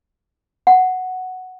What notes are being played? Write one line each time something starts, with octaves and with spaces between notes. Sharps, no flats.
F#5